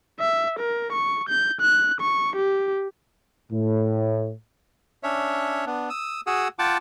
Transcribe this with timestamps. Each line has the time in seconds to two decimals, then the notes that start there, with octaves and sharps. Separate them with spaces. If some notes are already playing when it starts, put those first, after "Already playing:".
0.20 E5
0.59 A#4
0.92 C#6
1.29 G6
1.61 F#6
2.01 C#6
2.36 G4
3.52 A2
5.03 C#4 D4 C#5 E5
5.66 B3 D4
5.90 D#6 E6
6.27 F#4 G#4 F#5 D#6 E6
6.59 F4 F#5 G5 A5 D6